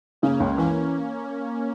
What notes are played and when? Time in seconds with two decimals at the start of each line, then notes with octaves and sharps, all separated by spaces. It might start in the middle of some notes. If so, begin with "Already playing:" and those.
0.22 C#3 A#3 C#4
0.40 C#2
0.58 E3 A#3 C#4